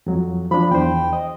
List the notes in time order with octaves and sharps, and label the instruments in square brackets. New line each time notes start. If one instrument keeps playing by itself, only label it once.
[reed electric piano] F2 F#3
[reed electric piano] F3 D4 [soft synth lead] B5
[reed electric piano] E2 C5 [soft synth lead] G5
[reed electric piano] D#5